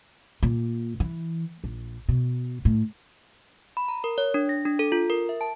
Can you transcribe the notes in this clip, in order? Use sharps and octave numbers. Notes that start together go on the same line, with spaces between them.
A#2
E3
A#1
B2
A2
B5
A#5
A#4
C#5
D4
A#6
D4
A4
F4
A#4
E5
A5